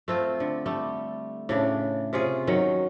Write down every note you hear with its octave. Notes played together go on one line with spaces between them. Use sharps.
A3 C4 F4
D3
G3 A3
A2 C#3 D4
C3 C#4 F4 G#4
D#3 F#3 C#4